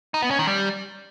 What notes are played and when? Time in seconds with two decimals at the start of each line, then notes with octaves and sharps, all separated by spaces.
0.14 D#4
0.22 B3
0.31 C#4
0.39 D#3
0.47 G3